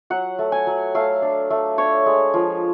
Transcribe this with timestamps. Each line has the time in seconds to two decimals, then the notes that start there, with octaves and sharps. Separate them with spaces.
0.10 F#3 F#5
0.39 A3
0.52 G#5
0.67 F#3
0.95 A3 F5
1.22 D4
1.50 A3
1.78 D4 C#5
2.06 G#3
2.34 F3